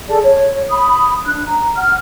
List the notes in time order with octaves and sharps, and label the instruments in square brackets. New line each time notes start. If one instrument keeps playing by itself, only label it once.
[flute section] G#4 A4 D5 A5
C#5
B5 D#6
D4 F#6
A#5
F#5 F6